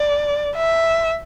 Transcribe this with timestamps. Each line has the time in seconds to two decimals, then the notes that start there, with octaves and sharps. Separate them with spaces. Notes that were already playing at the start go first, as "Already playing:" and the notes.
Already playing: D5
0.56 E5